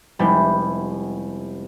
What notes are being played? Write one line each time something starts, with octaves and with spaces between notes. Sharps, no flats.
F1 G3 G#3 B3 E4 G6